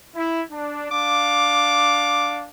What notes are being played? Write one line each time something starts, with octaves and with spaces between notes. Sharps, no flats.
E4
D4
D4 F5 D6